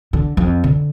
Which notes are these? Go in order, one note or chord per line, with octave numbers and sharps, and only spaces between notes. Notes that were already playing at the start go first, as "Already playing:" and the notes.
D3
F2
D3